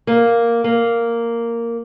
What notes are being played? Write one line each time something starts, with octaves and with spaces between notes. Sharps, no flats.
A#3
A#3